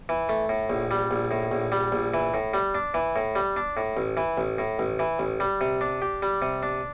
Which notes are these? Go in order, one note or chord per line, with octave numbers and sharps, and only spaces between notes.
E3
A3
A2
A#1
G3
A#1
A2
A#1
G3
A#1
E3
A2
G3
D4
E3
A2
G3
D4
A2
A1
E3
A1
A2
A1
E3
A1
G3
C3
D4
G4
G3
C3
D4